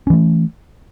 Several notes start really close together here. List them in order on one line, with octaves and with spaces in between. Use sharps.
C#4 E3 A3